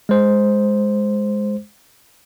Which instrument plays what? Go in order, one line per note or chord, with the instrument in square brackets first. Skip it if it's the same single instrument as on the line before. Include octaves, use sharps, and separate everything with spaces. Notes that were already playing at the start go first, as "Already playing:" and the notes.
[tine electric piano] G#3 C5